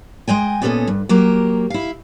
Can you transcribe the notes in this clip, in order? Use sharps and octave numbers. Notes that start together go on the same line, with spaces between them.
G#3 D#5 G5 G#5
A#2 B3 C#4 G4 A4 D#5
G2
F#3 A#3 G4 A#4
E4 F5